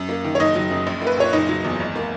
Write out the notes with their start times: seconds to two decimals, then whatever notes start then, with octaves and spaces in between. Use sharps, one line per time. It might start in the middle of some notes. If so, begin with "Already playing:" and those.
Already playing: F#2
0.09 A#3
0.24 D#3
0.35 C#5
0.40 F#1 D#4 D#5
0.55 F#3
0.71 F#2
0.87 A#1
1.02 A#3 B4
1.18 A#2 C#5
1.33 F#1 D#4 D#5
1.49 F#3
1.64 E2
1.80 G#1
1.96 A#3